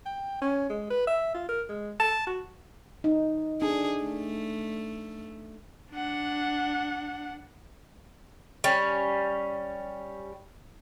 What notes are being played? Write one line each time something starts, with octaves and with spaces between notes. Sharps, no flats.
G5
C#4
G#3
B4
E5
F4
A#4
G#3
A5
F#4
D#4
D4 G#4
A3
D4 F#5
G3 C#4